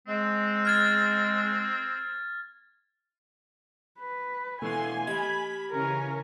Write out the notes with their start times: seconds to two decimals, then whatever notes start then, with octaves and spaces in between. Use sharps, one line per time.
0.08 G#3 C4
0.65 F6 G#6 A6
3.99 B4
4.62 B2 E3 A3 B3 G#5 C6
5.07 G4 D#5 B5 G#6
5.72 C#3 E3 C#4 A#4